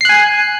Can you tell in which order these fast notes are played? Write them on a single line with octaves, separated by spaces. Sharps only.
C7 F#6 G#5